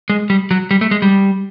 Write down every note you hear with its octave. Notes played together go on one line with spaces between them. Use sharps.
G#3
G3
F#3
G3
A3
G#3
G3